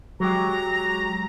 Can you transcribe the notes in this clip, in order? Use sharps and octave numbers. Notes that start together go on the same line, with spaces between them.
F#3 G#3 G4 A#5